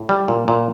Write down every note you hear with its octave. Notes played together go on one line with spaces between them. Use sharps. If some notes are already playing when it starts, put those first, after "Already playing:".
Already playing: A2
G3
A#2
A#2